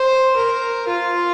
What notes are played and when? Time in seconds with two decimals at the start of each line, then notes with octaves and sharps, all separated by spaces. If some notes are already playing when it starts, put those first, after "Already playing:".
Already playing: C5
0.36 A#4
0.87 F4